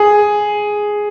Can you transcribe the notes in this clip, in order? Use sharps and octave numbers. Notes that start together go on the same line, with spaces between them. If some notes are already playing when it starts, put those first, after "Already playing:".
Already playing: G#4